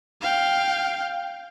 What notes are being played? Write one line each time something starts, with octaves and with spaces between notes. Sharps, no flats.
F5 G5